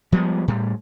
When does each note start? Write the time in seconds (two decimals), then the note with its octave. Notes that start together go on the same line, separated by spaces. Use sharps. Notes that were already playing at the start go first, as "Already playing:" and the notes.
0.12 F3 G3 G#3 B3
0.48 A2 G3